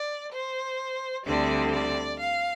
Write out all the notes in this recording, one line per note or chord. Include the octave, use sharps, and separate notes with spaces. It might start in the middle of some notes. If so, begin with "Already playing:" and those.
Already playing: D5
C5
D2 D3 G3 C4 D5
D5
F5